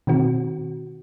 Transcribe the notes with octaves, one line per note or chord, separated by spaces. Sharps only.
B2 D#3 C4 F#4